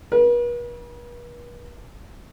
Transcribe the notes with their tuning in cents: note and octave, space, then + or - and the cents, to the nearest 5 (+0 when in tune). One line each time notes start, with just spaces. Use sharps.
B4 -45